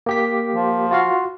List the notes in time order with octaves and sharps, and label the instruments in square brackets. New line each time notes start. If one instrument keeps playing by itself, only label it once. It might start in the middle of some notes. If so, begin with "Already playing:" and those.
[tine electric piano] A#3 G4 B6
[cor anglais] F3
[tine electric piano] F4 F#4 F5